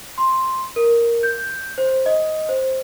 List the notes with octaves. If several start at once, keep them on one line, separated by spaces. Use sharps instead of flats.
C6
A#4
G6
C5
D#5
C5